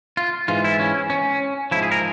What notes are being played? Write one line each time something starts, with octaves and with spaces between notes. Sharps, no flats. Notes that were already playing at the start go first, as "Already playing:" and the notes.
F4
G#2 E3 F4
E4
C#4
C#4
G#2 F3 E4
G#4
A#4